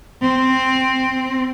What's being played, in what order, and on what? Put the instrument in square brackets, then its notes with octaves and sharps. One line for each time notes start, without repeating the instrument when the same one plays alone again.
[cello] C4